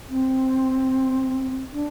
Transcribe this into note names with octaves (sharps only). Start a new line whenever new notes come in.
C4
D4